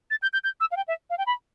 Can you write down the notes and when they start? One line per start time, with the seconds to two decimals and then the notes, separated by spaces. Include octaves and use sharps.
0.11 A6
0.22 G6
0.33 G6
0.44 G6
0.60 E6
0.72 F5
0.76 G5
0.88 E5
1.10 F5
1.18 G5
1.26 B5